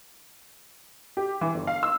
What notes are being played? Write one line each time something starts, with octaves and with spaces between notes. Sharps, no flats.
G4
E3
G1
F5
E6